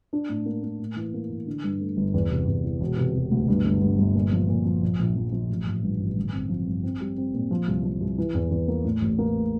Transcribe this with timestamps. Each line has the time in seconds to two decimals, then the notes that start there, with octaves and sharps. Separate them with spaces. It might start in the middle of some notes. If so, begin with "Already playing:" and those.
0.13 D4
0.29 A2
0.46 A#3
0.63 A#3
0.79 A2
0.97 E3
1.14 A#3
1.30 E3
1.46 D3
1.63 G2
1.81 A3
1.97 G1
2.14 E2
2.31 C3
2.47 E2
2.64 E3
2.81 E1
2.97 C3
3.15 E1
3.31 D2
3.48 G2
3.65 G1
3.82 G2
3.98 G1
4.15 A#2
4.32 F3
4.49 A#2
4.65 F3
4.82 A#1
4.99 A#1
5.16 F3
5.32 F3
5.49 A1
5.66 A1
5.83 G2
5.99 A1
6.17 G1
6.33 C4
6.49 F3
6.67 G1
6.83 C4
7.01 G3
7.17 C4
7.34 A#2
7.51 F3
7.67 C2
7.84 F3
8.01 C2
8.18 E3
8.34 E2
8.51 E2
8.68 A#3
8.84 A2
9.02 A1
9.19 A#3
9.35 A2